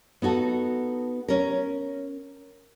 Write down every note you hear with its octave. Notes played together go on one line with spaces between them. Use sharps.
B3 D#4 F#4 A4
C#4 A#4